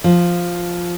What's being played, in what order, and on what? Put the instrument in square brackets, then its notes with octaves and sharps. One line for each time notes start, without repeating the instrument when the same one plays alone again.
[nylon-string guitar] F3